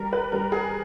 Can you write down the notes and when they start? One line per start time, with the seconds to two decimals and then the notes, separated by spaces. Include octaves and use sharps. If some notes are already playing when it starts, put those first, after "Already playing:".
Already playing: G3 A#4
0.13 B4
0.32 G3 A#4
0.52 G#4